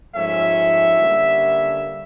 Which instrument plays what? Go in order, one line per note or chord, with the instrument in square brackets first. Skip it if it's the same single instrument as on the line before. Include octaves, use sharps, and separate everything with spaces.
[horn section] G#2 F3 A3 C#4 E5
D3 G3 A#3 C#4